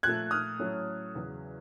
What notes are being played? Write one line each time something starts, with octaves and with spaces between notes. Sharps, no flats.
A#2 F3 A3 F#6 G#6
D#6 F6
A2 F#3 A3 C#4
E2 C#3 F#3